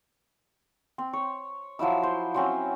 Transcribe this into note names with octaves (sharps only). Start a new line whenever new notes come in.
C4
C#5
F3 F#3 E4 E6
C5
F#3 C4 C#4 C5